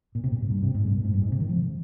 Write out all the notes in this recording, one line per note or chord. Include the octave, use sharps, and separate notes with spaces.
A#2
C3
A#2
G#2
G2
C3
G#2
G2
A#2
G#2
G2
G#2
C3
D#3
F3